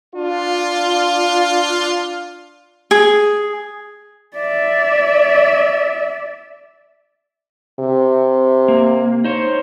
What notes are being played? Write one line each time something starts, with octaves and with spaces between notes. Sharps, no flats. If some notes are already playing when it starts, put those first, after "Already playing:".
D4 F4
G#4
D5 E5
C3
A#3
D#4 C5 C#5